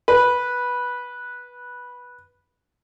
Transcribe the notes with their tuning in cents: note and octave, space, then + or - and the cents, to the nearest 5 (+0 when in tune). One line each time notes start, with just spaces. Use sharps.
B4 -10